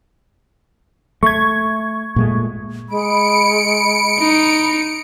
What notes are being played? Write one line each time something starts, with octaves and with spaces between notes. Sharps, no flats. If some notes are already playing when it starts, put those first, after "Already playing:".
A3 C#6 G#6
A#2 G#3 A3
G#3 B5 C#7 D7
D#4